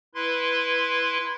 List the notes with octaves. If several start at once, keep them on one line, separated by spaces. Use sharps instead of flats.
E4 B4 C6